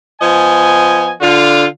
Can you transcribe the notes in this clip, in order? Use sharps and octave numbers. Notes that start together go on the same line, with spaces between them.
F3 B3 D#5 G#5
D3 F4